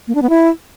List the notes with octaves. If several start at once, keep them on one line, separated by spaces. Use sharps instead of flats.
A#3
D4
B3
E4